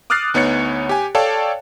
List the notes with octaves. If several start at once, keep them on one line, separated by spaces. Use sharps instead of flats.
D6 D#6 F6 F#6 A6 C7
D2 B3 D#4 C#5 F#6 C#7
G4 G#5
A4 C#5 D5 F5 G5 A5